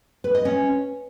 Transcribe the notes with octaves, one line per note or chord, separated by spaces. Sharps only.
B4
D#5
C#4